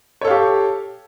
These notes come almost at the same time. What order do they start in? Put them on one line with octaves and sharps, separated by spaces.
C#5 A4 F5 G4